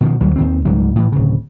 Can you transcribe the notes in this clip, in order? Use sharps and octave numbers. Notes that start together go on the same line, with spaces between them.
B2 D#3 F3
D2 F#3 G3
D#2 D#3 C4
C#2 G#2 F#3 G3
A2 E3
D1 C#3